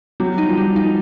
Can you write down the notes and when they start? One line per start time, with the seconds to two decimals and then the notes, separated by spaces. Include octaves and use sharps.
0.20 F#3 G3
0.38 D#4
0.48 F3
0.58 G3
0.76 D#4